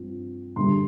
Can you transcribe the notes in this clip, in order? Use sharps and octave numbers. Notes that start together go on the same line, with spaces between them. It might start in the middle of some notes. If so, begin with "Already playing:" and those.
Already playing: G2 F3 C4
G2 D3 G3 C6